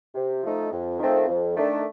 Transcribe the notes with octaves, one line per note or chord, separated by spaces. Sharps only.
C3
F3 A3 D#4
F2
D#3 A3 C4 F4
F2
D#3 A3 D4